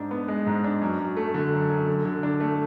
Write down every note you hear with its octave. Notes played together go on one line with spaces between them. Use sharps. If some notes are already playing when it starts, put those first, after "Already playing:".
Already playing: G#2 D4
B3
G#3
G#2
D4
F#2
F#2
A3
D3
F#2
F#2
D3
D3
D4
A3